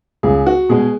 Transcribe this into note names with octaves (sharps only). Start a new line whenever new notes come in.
C#2 G#4
F#4
B2 G#3 G#4